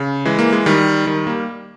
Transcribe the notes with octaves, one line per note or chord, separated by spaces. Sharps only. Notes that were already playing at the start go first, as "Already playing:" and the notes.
Already playing: C#3
E3 G#3
A#3
G#3
D#3 G3
D#3 G3
G3 A#3